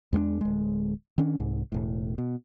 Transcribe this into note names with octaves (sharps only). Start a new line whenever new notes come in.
E2 G#3 A#3 D4
D1 G#3
D#3 C#4 D4
C2 G#2
E1 A2
B2